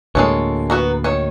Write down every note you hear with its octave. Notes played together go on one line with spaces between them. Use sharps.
D2 A2 G#3 A#3 A4 C#5
B3 F#4 A#5
D#3 C#5